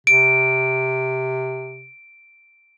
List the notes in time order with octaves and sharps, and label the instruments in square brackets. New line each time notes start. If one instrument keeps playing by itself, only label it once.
[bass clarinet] C3 [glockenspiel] D7